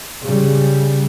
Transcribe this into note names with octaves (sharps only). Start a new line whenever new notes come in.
C#3 G3